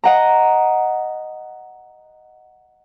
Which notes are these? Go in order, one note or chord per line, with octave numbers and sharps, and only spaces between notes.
D#5 F#5 A#5